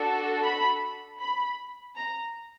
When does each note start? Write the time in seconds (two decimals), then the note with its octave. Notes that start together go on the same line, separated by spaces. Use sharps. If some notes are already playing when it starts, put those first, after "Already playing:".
Already playing: D4 F#4 A4
0.43 B5
1.19 B5
1.96 A#5